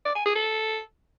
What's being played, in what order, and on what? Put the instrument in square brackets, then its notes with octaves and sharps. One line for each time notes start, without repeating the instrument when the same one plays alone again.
[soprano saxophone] D5
G#5
G#4
A4